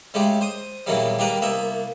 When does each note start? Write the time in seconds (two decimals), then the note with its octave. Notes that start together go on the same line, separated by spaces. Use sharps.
0.14 C#3 G#3 A3 G4
0.41 C5 D#6
0.86 E2 A#2 D#3 E3 F#3 G3
1.19 D#3 G3 A#3 A#4 B4
1.42 C2 A#3 B3 E5